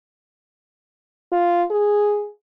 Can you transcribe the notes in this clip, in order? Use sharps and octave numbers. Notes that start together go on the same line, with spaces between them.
F4
G#4